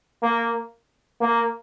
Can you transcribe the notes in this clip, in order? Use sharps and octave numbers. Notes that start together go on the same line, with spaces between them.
A#3
A#3